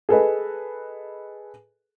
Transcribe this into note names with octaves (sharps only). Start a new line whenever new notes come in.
G#4 A4 B4 D#5